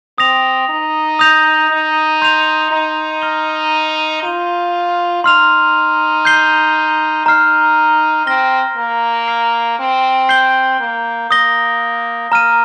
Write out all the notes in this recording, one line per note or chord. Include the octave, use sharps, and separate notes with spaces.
C4 D#6 A#6 F7
D#4
D#6 G6 A#6 F7
D#4
C6 G6 C7 F7
D#4
A#5 F6 A#6 G7
F4 G6 D#7 G7
D#4 C6 F6 C7 F7
G6 C7 G7
D#4 A#5 F6 C7
C4 F6 A#6 G7
A#3
F6 C7 F7
C4
G6 C7 G7
A#3
A#3 D#6 A#6 G7
A#3 A#5 F6 D#7